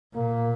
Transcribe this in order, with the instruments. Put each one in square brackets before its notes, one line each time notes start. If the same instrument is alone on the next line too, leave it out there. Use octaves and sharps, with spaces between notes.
[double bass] A#2 [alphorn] A#3